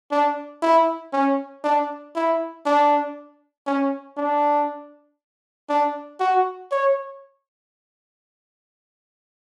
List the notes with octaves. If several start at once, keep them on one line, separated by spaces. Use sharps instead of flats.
D4
E4
C#4
D4
E4
D4
C#4
D4
D4
F#4
C#5